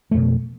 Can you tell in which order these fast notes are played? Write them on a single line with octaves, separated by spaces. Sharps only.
A3 F2 B2